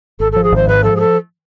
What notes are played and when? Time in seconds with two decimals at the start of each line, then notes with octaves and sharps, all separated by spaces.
0.20 G#1 A4
0.32 F3 A4
0.44 G#4
0.52 G#1 C5
0.67 G#2 B4
0.83 F3 A4
0.96 G#4
1.00 A4